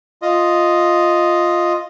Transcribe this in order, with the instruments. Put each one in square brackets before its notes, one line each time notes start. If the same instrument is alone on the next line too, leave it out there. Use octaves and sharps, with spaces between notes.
[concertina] F4 D#5